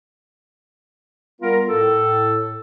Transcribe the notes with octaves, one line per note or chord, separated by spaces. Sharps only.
G3 B3 F4 A#4
A2 A4